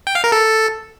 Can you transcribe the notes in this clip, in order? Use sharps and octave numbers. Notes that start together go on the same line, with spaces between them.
G5
F5
A#4
A4